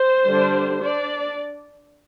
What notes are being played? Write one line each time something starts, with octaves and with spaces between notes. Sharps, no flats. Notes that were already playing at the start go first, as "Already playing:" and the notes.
Already playing: C5
D3 G3 D4
D4 D5